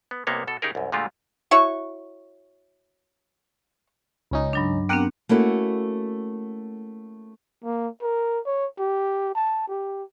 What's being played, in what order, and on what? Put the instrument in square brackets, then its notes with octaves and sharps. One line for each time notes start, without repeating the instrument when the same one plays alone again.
[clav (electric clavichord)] B3
C2 C3 A#3 B3 C#5
B2 A4
C#3 D#4 G4 G#4 A#4
C2 F#2
A#2 D3 G#3 A3 F4 G4
[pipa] E4 F#4 C#5 C#6
[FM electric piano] C#2 C#4 D#4
[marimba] G2 F#3 D4
[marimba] B3 C4 D4 [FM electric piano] G4 A#4 F#5
[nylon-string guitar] A3 A#3 C#4 E4 F#4
[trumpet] A#3
A#4
C#5
G4
A5
G4